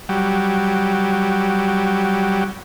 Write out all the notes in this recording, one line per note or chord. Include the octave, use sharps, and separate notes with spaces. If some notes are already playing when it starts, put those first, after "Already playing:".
F#3 G3